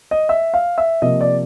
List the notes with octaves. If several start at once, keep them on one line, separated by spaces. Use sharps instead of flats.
D#5
E5
F5
E5
C3 F3 A#3 D#5
D5